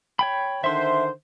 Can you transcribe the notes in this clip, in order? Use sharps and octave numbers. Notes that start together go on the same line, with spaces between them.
C#5 G5 B5
D3 D#3 C5 E5 C6